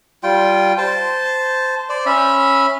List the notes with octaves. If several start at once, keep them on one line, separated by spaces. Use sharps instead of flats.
G3 F4 G5
C5 A5
C5 D5
C#4 E5 B5